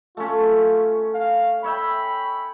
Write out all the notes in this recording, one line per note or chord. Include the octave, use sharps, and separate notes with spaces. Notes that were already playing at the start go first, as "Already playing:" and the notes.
A3 C#4 F4
F5
C#5 E5 G5 B5